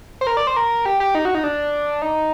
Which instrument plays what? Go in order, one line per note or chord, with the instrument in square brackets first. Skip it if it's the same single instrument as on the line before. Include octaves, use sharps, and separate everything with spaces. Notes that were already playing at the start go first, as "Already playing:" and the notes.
[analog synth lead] C5
A#4
D5
C5
A#4
G4
G4
D#4
F#4
D#4
D4
D#4